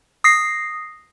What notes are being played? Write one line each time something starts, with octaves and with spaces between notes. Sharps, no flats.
D#6 A#6 C7